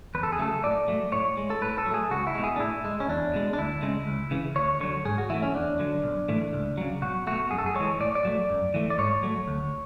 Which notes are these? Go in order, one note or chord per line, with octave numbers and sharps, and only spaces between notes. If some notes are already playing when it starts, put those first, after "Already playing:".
E2 B4
A4
G#4
C#3 F#3 A3 A4
A2 D5
F#3 A3
A2 C#5
G#3
A4
A2 B4
A4
F#3
A3 G#4
C#2 F#4
E4
B2 G#3
G#4
D4
A2 E4
G#3
C#4
E2 D4
B2 G#3
D4
D2 E4
C#3 G#3
C#2
C#3 E3
D2 C#5
D3 F#3 C#5
G#2 G#4
F#4
E3 A3 E4
C#4
E2 D4
D3 F#3
B1
A2 E3 A3
C#2
C#3 F#3
B1 F#4
B2 A3 F#4
F#2 G#4
A4
G#4
E3 G#3 C#5
A2 D5
D5
F#3 A3
F#2
E3 A3
D5
G#2 C#5
F#3 A3
D2